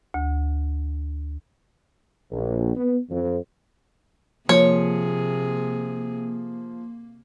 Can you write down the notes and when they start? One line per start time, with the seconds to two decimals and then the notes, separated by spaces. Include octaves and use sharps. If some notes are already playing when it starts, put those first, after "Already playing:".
0.14 D2
2.31 A#1
2.75 B3
3.10 F2
4.49 C3 F3 A#3 G#4 C#5